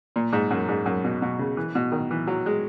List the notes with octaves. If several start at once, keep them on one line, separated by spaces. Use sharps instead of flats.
A#2
G#2
F#2
G#2
F#2
B2
B2
C#3
E3
B2
D#3
E3
F#3
G#3